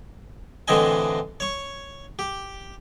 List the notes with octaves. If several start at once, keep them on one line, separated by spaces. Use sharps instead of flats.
A2 D3 E3 C4 D#5 G#5
C#5 C#6
G4